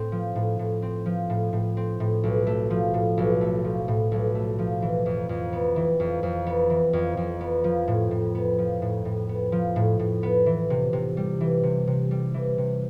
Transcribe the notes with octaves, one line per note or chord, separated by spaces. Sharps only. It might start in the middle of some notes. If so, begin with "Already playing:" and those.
Already playing: A2 C4
F3
A2
A2
C4
F3
A2
A2
C4
A2
B1
A3
F3
A2
B1
A3
F3
A2
B1
A3
F3
E3
F2
F2
B3
E3
F2
F2
B3
E3
F2
F2
B3
F3
A2
A2
B3
F3
A2
A2
B3
F3
A2
A2
B3
E3
C3
C3
G3
E3
C3
C3
G3
E3
C3